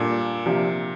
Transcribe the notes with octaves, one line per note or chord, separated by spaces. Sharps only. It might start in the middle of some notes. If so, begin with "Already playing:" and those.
Already playing: A#2 G3 D4 A4
C3 F3 A#3 D4 G4